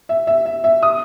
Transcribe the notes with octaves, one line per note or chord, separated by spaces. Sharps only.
E5
E5
E5
E5
D#6